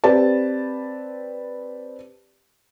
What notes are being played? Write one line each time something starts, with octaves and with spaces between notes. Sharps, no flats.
C4 G4 B4 D5 A5